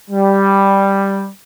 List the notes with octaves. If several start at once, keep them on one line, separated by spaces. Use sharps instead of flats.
G3